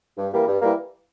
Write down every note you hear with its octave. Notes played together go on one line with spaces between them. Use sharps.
G2
E3 G3 A#3
G2
E3 G3 A#3